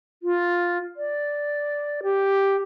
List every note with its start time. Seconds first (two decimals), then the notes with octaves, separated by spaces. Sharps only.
0.23 F4
0.97 D5
2.03 G4